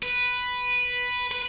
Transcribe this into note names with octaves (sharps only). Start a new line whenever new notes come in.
B4
B4